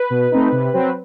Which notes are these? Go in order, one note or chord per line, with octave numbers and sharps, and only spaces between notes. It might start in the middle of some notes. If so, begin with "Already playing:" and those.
Already playing: B4
B2
A3 C4 D#4
C3
F#3 C4